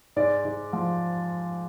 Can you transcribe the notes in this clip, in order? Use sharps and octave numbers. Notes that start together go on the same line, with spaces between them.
G#2 D5
G#2
F3